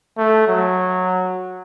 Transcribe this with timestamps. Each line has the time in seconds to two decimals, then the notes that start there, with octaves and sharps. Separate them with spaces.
0.18 A3
0.47 F#3